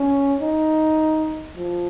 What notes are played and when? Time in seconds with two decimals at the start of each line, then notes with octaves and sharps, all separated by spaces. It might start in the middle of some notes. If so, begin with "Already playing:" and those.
Already playing: C#4
0.40 D#4
1.56 F3